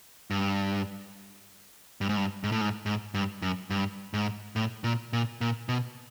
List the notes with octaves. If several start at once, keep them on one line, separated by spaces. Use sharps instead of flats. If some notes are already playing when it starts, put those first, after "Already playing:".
G2
G2
G#2
G2
G#2
A2
G#2
G#2
G2
F#2
G2
G#2
A2
A#2
A#2
A#2
B2